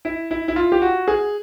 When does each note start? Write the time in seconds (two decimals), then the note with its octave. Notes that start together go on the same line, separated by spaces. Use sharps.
0.05 E4
0.31 E4
0.48 E4
0.56 F4
0.72 G4
0.82 F#4
1.08 G#4